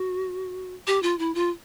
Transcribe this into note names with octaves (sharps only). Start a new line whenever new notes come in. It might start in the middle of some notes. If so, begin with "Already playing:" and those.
Already playing: F#4
G4
F4
E4
F4